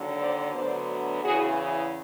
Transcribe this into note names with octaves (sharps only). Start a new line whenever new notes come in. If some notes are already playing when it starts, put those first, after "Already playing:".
Already playing: D#2 D3 F#3
C5 D5
D2 D3 F#3 B3 D4 C5 D5
E2 C#3 E3 F#4 G#4